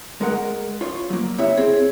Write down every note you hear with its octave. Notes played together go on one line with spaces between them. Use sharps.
G#3 A#4 F#5
F4 C#5
F#3 A#3
C3 E4 C#5 E5
C4 G#4